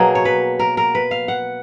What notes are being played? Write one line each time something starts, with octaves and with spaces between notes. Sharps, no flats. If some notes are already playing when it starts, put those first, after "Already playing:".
Already playing: B2 F#3 A#3 G#4
C#5
B4
A#4
A#4
B4
F5
F#5